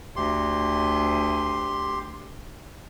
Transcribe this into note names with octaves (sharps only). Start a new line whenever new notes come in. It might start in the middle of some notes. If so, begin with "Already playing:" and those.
D2 G4 C6